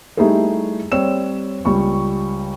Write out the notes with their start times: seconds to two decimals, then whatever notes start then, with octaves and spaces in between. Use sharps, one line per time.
0.17 G3 A3 D#4 E4 G4 G#4
0.92 G3 C4 C#5 D5 E6 E7
1.65 C#2 G3 C#6